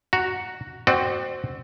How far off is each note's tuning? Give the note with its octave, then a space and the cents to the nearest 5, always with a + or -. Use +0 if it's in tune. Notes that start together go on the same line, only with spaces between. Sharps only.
F#4 +0 A#5 +0
C4 +0 F#4 +10 D5 +40